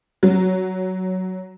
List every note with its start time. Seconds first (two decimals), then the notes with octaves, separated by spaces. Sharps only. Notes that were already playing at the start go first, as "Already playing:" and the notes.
0.23 F#3